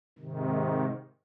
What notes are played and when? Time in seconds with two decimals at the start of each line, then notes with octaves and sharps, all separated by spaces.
0.18 G#2 C3 D#3